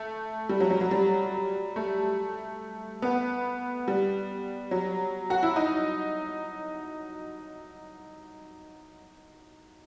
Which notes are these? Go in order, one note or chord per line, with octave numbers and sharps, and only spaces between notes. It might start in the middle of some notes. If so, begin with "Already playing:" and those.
Already playing: A3
G3
F#3
F#3
F#3
G3
A3
B3
G3
F#3
F#4
E4
D#4